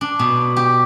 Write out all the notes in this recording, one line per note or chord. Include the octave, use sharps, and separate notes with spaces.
D4
B2
G4